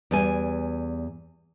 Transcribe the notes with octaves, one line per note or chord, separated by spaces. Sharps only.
E2 G3 G#5